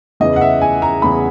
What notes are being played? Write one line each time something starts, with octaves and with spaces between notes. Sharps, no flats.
E2 C#3 E3 D#5
F#5
E5
G#5
A#5
E2 C#3 E3 B5